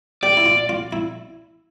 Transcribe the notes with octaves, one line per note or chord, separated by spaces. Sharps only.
G4 D5
E4
F4
F4
E4